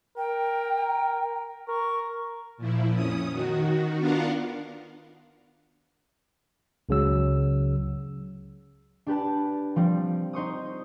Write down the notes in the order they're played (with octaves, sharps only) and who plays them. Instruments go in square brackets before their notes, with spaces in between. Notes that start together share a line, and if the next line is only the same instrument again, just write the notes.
[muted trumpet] A#4 [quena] G5
[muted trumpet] A#4 [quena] C#6
[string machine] A#2 F3 E4
F2 C#4 D#6
D#3 F#4
B3 D4 F4 A#4 F5 F#5
[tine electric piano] C#2 C#3 F#3 E6
[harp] D4 G4 B4 A5
F3 G3 C4
D#4 C5 C#6 D#6